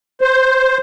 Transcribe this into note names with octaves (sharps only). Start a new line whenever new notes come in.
C5